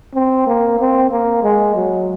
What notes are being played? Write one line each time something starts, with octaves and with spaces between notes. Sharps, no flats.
C4
A#3
C4
A#3
G#3
F#3